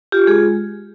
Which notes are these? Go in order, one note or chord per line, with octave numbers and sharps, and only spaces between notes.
F4 G4
G#3 G#4